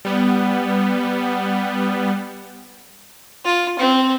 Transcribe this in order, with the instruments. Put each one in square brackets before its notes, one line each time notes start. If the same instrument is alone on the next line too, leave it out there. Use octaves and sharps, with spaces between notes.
[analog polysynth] G3 B3
[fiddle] F4
C4